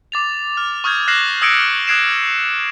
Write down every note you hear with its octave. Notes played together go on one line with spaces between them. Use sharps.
D6 A6 F7
F6
C#6 D#6 F6 G6 G#6
F6 F#6 A#6 C7 E7 F#7
D#6 E6 G#6 A#6 C#7 D7
D#6 F#6 G#6 C7 D7 E7